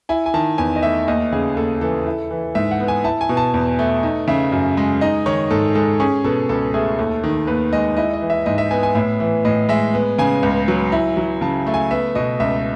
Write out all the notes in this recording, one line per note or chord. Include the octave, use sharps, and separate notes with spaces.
E4 G#5
G#5
D#3 A5
E2 G#5
D#5
A3 E5
D#2 D#5
C#3 G#4
D#2 A4
E3 A4
E4
E3
G#2 E5
F#5
B3
G#5
E4 A5
G#5
B2
A5
E2
A3
D#4
C#3 E5
F#2
G#3
D#4 D#5
D#3 C#5
G#2 A4
G#3 A4
C#4 G#4
B2 A4
C#2 A4
A3 G#4
D#2 A4
D#3
D#2 B4
G#3 D#5
E4 D#5
D#5
E3
E5
G#2 D#5
E5
B3 G#5
G#5
A2 E5
E3
A2 D#5
G#3 E5
B3
C#3 G#5
C#2
F#3
E4
F#3
C#3 A5
A3
G#5
B3 E5
B2 D#5
C#2 E5